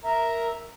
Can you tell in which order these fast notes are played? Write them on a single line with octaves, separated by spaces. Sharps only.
A#4 E5 A#5